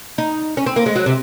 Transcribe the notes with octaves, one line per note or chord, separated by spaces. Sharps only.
D#4
C#4
C4
A#3
G#3
F#3
C3